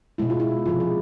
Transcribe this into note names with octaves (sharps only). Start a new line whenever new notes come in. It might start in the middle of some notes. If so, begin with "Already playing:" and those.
B2 G#3 E4
F4
E4
C3 F3 G#3 F4
G#4